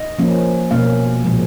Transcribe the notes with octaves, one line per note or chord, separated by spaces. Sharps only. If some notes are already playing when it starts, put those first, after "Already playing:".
Already playing: D#5
F3 A#3 C#4
B2 A#3 C#4 F5
A#2 F3 G#3